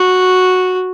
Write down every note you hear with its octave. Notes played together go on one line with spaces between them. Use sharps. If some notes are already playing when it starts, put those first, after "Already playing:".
Already playing: F#4